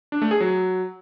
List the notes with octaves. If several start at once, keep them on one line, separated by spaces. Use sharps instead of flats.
D4
A3
G#4
F#3